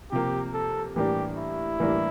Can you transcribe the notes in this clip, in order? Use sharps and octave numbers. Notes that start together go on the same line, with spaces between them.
C3 F3 A#3 G4
A4
A2 E3 G3 A#3 D4 G4
E4
A2 E3 G3 A#3 D4